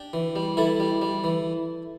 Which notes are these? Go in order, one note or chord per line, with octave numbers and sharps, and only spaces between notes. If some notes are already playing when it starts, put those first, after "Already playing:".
Already playing: D4 G4
E3
G3
E3 E4 A4
G3
G3
E3